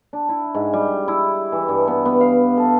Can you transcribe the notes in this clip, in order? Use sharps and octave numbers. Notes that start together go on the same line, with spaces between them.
D4
E4
G#2
G3
E4
E3
G2
B3
B3
F5
A4